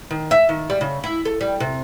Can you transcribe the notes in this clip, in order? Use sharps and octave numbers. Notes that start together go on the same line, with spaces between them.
D#3
E5
D#3
G3
C#3
E4
A4
G3
C3